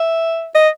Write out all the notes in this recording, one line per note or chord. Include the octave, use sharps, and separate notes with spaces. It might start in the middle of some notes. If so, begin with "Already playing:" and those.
Already playing: E5
D#5